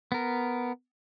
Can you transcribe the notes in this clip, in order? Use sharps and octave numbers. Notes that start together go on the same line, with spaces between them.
B3 A#4